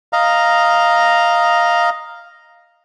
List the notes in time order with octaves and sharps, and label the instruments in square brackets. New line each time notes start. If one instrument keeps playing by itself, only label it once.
[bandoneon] D#5 F5 A#5